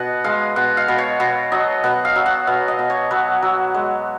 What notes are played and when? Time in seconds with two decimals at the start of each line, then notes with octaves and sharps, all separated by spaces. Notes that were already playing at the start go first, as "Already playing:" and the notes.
Already playing: B2 B4 D#5 F#5
0.24 G#3 F5
0.56 B2 F#5
0.77 F5
0.88 B2
0.98 C#5
1.20 B2
1.52 F#3 D#5
1.84 B2 F#5
2.05 F5
2.16 F#3
2.26 F#5
2.47 B2 F5
2.68 D#5
2.79 B2
2.90 C#5
3.11 F#3 B4
3.42 F#3
3.74 G#3